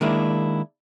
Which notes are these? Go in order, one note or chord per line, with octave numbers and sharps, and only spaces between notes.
D#3 G#3 A#3 D4 E4